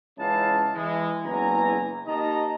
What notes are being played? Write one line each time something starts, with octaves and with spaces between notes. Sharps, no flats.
C#2 E3 C#4 D#4 F5 A5
E3 G#3
F#1 E2 B3 G#5 A#5
D#2 D#3 D#4 D#5 A5 A#5